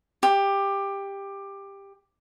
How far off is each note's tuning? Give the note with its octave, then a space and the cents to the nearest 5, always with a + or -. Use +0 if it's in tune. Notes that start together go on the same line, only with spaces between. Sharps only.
G4 +15